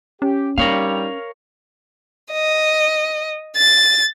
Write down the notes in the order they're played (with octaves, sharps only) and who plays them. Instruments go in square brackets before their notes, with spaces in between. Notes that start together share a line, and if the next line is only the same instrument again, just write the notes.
[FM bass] C#4 [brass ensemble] G4
[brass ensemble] G2 G3 [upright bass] D#4 [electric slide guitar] A#4 C#5 F5
[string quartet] D#5
A6